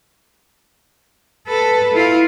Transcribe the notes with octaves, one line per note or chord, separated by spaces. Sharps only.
A4 B4
E4 F4